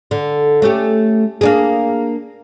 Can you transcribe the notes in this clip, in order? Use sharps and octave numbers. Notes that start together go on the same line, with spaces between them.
D3
A3 C#4 G4
A#3 D4 G#4